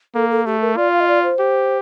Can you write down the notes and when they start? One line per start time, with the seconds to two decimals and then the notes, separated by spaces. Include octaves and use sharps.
0.15 A#3 A4
0.30 A4
0.46 A3 G4
0.61 A#4
0.77 F4 D5
0.93 F5
1.00 D#5
1.08 D5
1.23 C5
1.39 G4